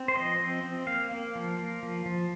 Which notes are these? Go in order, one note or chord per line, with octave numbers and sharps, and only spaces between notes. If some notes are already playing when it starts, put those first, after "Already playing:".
Already playing: C4
C5
F3 D#5
C4
C4
A#3 F5
A#3
F3
A#3
F3
F3